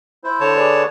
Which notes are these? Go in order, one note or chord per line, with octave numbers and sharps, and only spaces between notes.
E4 C5
D3 C#5 A5
G#4 B4 D5